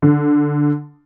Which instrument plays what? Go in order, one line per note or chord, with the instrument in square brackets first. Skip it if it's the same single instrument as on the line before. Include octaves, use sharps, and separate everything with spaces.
[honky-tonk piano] D3